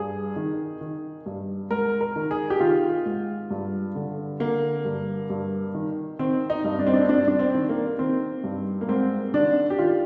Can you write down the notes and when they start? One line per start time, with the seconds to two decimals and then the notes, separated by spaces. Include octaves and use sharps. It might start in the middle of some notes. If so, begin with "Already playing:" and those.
Already playing: G2 G#4
0.36 D#3
0.81 D#3
1.26 G2
1.71 G#2 A#4
2.01 A#4
2.16 D#3
2.31 G#4
2.50 G4
2.60 D#3 F4
3.06 G#2
3.50 G2
3.95 D3
4.40 D3 A#3
4.85 G2
5.30 G2
5.74 D#3
6.19 D#3 C4
6.50 D#4
6.64 G2
6.79 D4
6.87 C4
6.93 D4
7.05 C4
7.09 G2 D4
7.28 D4
7.39 C4
7.54 D#3
7.69 A#3
7.99 D#3 C4
8.44 G2
8.81 A#3
8.89 G#2 C4
9.34 D#3 D4
9.70 G4
9.78 D#3 F4